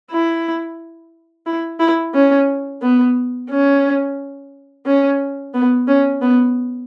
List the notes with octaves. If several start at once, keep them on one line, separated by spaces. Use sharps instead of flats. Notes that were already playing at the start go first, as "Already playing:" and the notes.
E4
E4
E4
C#4
B3
C#4
C#4
B3
C#4
B3